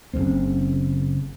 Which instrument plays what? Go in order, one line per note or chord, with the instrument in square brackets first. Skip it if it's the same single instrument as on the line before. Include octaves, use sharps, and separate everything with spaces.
[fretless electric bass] F#1 C#2 C#3 C4